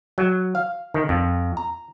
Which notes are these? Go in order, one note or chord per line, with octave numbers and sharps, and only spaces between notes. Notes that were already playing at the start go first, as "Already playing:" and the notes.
F#3
F5
D#3
F2
A#5